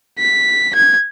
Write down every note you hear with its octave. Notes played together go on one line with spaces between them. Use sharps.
B6
G#6